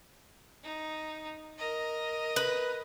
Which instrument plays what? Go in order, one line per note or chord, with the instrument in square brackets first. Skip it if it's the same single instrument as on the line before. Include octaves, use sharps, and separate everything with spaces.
[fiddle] D#4
A#4 D#5
[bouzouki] B4